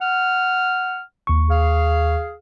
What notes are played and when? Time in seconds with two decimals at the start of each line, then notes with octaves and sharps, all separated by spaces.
0.01 F#5 F6
1.27 D#2 C#6
1.50 G#4 F5